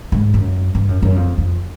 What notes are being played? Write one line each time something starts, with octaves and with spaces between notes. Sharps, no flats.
G#2
F#2
G2
F#2
F#2
F2
F2